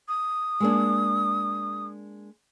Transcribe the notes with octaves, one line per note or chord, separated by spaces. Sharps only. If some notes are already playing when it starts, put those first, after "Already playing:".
D#6
G#3 A#3 D4